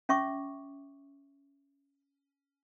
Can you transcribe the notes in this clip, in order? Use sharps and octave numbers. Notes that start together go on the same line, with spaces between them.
C#4 E5 C#6 D6